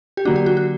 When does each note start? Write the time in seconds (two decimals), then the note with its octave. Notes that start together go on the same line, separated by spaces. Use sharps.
0.17 G4
0.25 D3 F#3 A#3 D4 F#4
0.36 G4
0.46 F#4
0.57 F#4